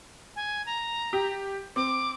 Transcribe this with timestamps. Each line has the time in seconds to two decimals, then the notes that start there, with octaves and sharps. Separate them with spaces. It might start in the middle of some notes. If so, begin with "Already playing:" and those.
0.36 G#5
0.66 A#5
1.13 G4
1.76 C4 D6